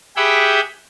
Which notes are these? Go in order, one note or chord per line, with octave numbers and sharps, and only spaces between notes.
G4 G#4 E5 F#5 G5 B5